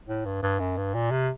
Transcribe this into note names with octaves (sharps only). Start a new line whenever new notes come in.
A2
G2
G2
F#2
G2
A#2
C3